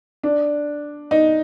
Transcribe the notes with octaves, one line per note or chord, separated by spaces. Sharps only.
D4
D#4